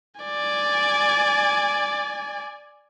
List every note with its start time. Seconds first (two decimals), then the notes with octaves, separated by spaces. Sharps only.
0.21 D5 G#5